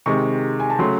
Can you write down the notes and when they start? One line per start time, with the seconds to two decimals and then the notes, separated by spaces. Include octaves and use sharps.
0.06 C3 D#3 G#3 C#6
0.60 G#5
0.70 A5
0.79 C#3 F#3 A3 C6